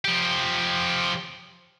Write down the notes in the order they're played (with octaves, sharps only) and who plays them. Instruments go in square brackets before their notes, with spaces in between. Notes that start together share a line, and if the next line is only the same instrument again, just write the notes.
[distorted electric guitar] F3 G4